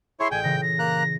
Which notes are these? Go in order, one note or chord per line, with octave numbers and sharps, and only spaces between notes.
E4 G#4 C#5 C6
A1 G5 G#5
A#2 C#3 E3 A#6
A#6
A#3 A#5 F#6